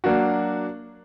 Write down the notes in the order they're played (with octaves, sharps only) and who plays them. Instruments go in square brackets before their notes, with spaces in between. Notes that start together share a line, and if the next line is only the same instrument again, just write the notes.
[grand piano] F#3 A#3 D4 F#4